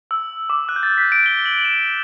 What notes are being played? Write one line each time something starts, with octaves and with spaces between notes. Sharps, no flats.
E6
D6
F#6
G6
A6
B6
D7
G7
F#7
F#7
E7